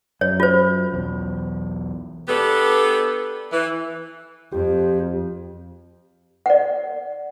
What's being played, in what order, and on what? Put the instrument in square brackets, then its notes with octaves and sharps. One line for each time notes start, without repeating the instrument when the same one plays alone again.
[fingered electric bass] F#2 [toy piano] C#5
[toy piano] F4 C5
[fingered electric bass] B1 E2
[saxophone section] B3 D4 G4 A4 B4
E3
[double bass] F2 [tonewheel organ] G4
[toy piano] D5 F#5